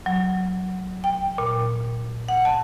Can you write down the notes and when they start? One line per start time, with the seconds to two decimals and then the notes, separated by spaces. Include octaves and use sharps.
0.06 F#3
1.04 G5
1.38 A#2
2.28 F#5
2.45 A5